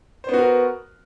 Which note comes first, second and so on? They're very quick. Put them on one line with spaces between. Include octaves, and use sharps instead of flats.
C5 B3 F#4 A#4